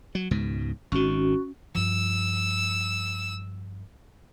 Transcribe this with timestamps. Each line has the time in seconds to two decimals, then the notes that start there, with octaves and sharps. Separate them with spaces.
0.15 F#3
0.31 C#2 G#2 B2
0.92 G#1 D#3 C#4 F#4
1.75 G2 F3 E6